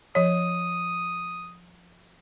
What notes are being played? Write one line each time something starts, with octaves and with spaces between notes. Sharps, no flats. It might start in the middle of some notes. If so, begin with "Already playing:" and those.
F3 C#5 D#6